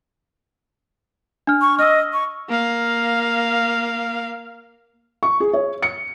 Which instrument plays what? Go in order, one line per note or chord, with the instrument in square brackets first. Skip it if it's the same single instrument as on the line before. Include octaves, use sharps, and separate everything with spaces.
[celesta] D4 F6
[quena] C#6
[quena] D#5 [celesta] E6 F6
[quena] C#6
[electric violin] A#3 F5
[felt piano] C#6
G#4
C#5
C#7